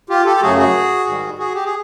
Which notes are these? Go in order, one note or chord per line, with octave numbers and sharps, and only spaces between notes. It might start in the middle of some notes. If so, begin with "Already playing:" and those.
F4 G4
G4 A4
A4
F#2 C#3 F#3 A3 F#4 G#4
F#4 G#4
G#2 D#3 G3
F#4 G#4
G4
G#4